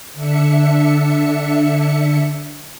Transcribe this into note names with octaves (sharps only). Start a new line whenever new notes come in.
D3 D4 E5 C#7